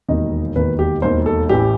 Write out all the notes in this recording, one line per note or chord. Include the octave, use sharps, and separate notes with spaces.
E1 D#2 D#3 D#5
E1 D#2 D#3 B4
G4
E1 D#2 D#3 C5
A4
A1 A2 E3 G4